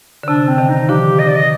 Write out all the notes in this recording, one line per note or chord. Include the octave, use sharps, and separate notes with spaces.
D3
C3 D4
C4
C3 D#3
D#4
D3 F3 G4
D#5
D5
D#5